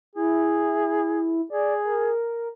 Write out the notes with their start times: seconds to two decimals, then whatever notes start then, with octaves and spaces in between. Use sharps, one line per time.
0.15 E4 G#4
1.50 G#4 D5
1.84 A#4